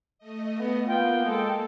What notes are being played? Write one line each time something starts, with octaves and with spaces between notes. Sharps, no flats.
A3 D#5
B3
A#3 B3 F4 G5
G#3 A4